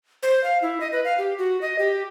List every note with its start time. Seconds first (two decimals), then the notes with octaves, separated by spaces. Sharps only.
0.23 C5
0.44 F5
0.62 E4
0.80 D#5
0.92 B4
1.05 F5
1.18 G4
1.38 F#4
1.62 D#5
1.79 G4